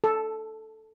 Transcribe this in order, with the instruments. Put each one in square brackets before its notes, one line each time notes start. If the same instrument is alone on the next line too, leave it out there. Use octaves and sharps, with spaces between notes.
[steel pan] A4